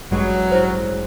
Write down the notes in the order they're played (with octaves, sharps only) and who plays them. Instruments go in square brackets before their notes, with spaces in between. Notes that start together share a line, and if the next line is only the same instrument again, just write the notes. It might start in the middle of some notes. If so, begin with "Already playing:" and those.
[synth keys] A1 G2 G#3 [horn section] F#3
[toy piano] E4 C5